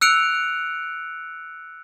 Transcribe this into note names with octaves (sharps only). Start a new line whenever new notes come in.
E6 F#6 C#7 D7 F7